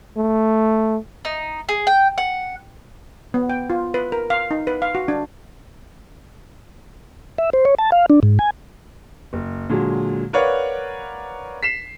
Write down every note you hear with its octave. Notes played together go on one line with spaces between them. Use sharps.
A3
D#4
G#4
G5
F#5
B3
G5
F4
B4
A#4
F5
D#4
B4
F5
F#4
D4
E5
C5
C#5
A5
F5
D4
G#2
G#5
F#1
A#2 D3 F#3 G#3
A#4 B4 C#5 D5 F5 F#5
B6 C7 E7